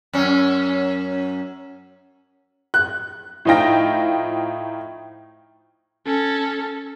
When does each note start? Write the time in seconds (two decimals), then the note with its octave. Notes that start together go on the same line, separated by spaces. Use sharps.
0.13 F#2 C#4
2.74 F#6
3.45 A2 F3 D#4 F4 G5 A#6
6.06 C#4 A4